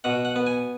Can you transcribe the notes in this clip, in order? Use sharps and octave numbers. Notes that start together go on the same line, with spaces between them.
B2 F#5
F#5
B3
G#5